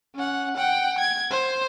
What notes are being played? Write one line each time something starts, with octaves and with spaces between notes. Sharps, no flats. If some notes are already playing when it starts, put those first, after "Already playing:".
C#4 F#5
F#5 G5
G#6
C5